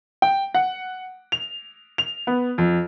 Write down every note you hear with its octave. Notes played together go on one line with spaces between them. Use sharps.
G5
F#5
F7
F7
B3
F2